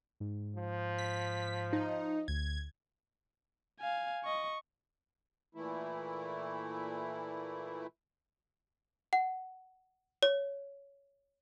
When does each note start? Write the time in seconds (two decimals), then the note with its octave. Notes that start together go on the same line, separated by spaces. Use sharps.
0.20 G#2
0.56 F3
0.98 B6
1.73 D#4
2.28 D2 G#6
3.80 F5 G#5
4.25 D#5 C#6
5.55 A#2 E3 A3 E4
9.13 F#5
10.23 C#5